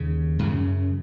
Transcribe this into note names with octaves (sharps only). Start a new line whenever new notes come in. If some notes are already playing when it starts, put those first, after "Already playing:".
Already playing: D#2 C#3
F#2 C#3